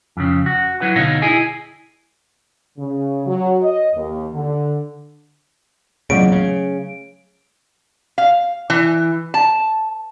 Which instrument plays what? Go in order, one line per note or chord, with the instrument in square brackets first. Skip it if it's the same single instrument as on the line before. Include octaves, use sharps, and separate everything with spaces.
[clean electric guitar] F2 C#3
F#4
F#3 E4 B4 F#5
D2 B2 D3 D#4 C#5 F5
E4 G#4 D#5 G#5
[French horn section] C#3
F#3
D#5
D#2
D3
[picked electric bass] E2 A#2 C#3 [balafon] F#3 A3 C#6 [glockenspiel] D7
[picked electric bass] C#3
[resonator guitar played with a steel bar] F5
E3
A5